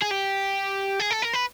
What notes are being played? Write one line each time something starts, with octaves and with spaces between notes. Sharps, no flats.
G#4
G4
G#4
A4
A#4
B4